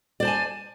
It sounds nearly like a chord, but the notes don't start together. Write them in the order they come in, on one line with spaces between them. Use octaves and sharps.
D5 C5 A5 G#5